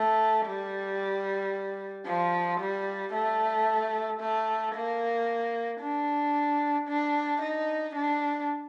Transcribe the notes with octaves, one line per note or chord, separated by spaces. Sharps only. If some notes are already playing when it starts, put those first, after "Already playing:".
Already playing: A3
G3
F3
G3
A3
A3
A#3
D4
D4
D#4
D4